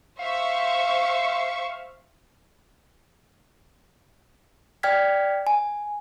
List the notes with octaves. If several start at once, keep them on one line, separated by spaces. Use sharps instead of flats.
C5 E5 F5 C#6
D5 G5 F6 G#6 B6
G#5